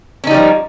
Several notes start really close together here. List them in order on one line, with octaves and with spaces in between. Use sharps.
C#4 D#4 G3 F3